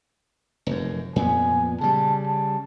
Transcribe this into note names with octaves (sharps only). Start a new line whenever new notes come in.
F1 F#2
F2 A#2 B3 G#5
C#3 G3 A5
A5